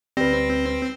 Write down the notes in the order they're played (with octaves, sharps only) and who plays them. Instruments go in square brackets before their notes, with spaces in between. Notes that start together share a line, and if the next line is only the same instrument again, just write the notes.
[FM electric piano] D2 G3 [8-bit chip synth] C4 [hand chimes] B4 A#6